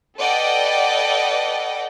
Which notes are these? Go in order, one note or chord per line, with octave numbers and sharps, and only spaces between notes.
A4 B4 D5 D#5 F#5 G5